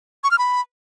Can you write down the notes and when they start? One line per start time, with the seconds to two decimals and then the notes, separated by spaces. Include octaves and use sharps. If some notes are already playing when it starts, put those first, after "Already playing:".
0.24 C#6
0.31 F6
0.38 B5